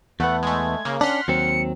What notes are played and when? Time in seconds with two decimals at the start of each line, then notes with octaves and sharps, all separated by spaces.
0.20 E2 A3 B3 F#5
0.43 G#3 A3 G#6
0.85 C#3 A#3
1.01 C#4 D4 F#5 C6 F6 B6
1.28 D#2 F#3 C4 C#7